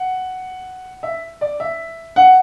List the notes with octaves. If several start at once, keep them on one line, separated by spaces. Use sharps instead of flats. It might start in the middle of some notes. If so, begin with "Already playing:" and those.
Already playing: F#5
E5
D5
E5
F#5